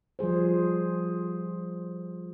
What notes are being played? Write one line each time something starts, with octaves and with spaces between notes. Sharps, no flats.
F3 G3 G#4 C5